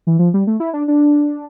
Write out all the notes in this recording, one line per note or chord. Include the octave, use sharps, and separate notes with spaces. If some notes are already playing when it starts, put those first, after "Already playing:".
E3
F3
G3
A3
E4
D4
D4